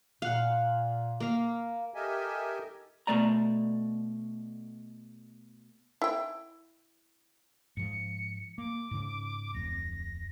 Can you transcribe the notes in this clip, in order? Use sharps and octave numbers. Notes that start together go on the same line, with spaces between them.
A#2 F5 F#5
A#3 F5
G4 A4 A#4 D#5 E5 G#5
B2 E3 A3 D5 A#5
E4 G5
G#2 F3 C#7
A#3 D6
G#2 C#3
D1 F2 A#6